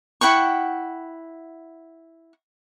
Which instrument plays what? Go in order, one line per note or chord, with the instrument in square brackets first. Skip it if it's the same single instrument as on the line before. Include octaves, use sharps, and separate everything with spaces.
[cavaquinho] E4 F#5 G5 C#6